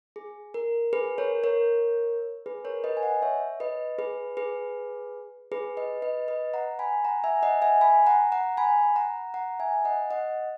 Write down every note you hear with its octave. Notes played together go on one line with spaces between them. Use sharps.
G#4
A#4
G#4 B4
A#4 C#5
A#4 C#5
G#4 B4
A#4 C#5
B4 D#5
G#5
D#5 F#5
C#5 E5
B4 D#5
G#4 B4
G#4 B4
G#4 B4
B4 D#5
B4 D#5
B4 D#5
F#5 A#5
G#5 B5
F#5 A#5
E5 G#5
D#5 F#5
E5 G#5
G#5 B5
F#5 A#5
F#5 A#5
G#5 B5
F#5 A#5
F#5 A#5
E5 G#5
D#5 F#5
D#5 F#5